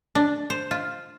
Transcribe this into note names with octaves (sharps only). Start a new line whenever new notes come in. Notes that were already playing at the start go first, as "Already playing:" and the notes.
D4
C5
F4